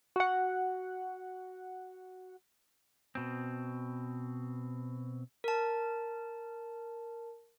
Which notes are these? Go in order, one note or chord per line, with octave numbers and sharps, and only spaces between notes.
F#4 F#5
B2 C4
A#4 A5